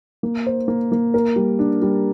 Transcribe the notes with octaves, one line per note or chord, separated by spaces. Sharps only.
A#3
C5
A#3
A#3
A#4
G3
D4
G3